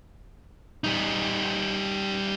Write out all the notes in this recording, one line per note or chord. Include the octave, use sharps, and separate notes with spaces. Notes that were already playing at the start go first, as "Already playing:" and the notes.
G3 D#4